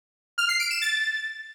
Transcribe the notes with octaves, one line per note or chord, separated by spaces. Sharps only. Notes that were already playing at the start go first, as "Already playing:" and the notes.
F6
C7
D7
E7
A6